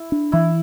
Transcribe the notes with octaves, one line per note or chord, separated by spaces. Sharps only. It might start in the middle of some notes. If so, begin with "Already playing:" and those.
Already playing: E4
D4
E3 E4